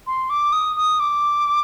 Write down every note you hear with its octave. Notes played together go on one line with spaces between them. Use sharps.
C6
D6
D#6
D#6
D6